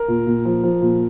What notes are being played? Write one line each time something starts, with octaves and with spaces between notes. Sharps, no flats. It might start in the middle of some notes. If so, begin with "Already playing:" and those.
Already playing: A#4
A#2
A#2
F3
F3
A#2